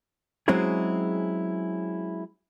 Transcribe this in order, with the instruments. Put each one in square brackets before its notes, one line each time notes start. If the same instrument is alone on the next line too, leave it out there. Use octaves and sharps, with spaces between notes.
[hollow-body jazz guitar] F#3 G#3 C4 C#4 E4 G#4